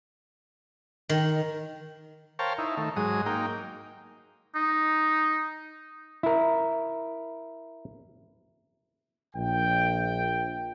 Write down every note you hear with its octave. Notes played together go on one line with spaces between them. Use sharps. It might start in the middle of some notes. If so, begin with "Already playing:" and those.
D#3
A#4 C5 C#5 F5 G5 A5
D#4 E4
D#3 A3
G#2 F#3 G#3 D#6
A#3 D#4 G5
D#4
E4 A#4
A#1 G5